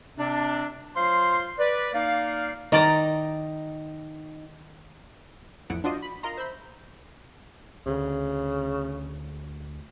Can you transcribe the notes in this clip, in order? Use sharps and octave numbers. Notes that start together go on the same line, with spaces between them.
C3 C4 D4
F#3 F4 C5 F5 C6
B4 D5
A#3 D#4 D5 F5
D#3 D#4 D5 D#5 A#5
A1 F2 E3 B3 F#5 D7
D4 F4 F#4 C5 D5 D#5
B5
F4 A#4 D#5 A#5 C6
C5 E5 B5 G6
D2 C#3